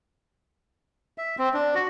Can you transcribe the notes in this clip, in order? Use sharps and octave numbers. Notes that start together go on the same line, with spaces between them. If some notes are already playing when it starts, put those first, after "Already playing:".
E5
C4
D4
F#4